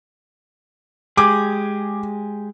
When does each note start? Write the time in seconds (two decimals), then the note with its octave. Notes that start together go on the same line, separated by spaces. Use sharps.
1.17 G#3 G4 G#4 D6